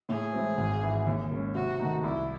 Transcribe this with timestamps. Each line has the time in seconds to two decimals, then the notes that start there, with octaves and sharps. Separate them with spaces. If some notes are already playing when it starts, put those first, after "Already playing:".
0.09 A2 G#4
0.33 E3 G#3 C4
0.57 G#1
0.82 G#2 E3
1.06 D#2
1.31 D#3 G#3 C#4
1.55 C3 F#4
1.79 D#3 A3 D#4
2.04 C2 E4